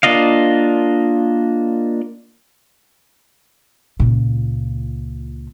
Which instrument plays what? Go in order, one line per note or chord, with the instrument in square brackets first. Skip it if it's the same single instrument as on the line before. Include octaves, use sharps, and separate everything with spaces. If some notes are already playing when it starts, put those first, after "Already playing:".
[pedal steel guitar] A#3 D4 F4 D#5 F5
[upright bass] C#2 A#2